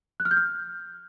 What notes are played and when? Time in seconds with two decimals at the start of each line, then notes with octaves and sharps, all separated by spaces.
0.20 F#6
0.25 F6
0.31 G6
0.37 F6